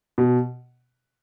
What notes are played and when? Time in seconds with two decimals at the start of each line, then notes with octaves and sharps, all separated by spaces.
0.18 B2